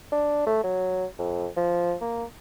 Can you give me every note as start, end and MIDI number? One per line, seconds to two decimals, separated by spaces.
0.12 0.43 62
0.46 0.59 57
0.64 1.05 54
1.19 1.48 41
1.57 1.94 53
2.01 2.24 58